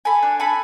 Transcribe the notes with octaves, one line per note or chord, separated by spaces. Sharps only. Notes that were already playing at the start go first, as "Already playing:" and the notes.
A4 G#5 B5
D4
A4 G#5 B5